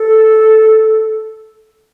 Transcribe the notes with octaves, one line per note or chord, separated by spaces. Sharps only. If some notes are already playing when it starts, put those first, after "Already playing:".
Already playing: A4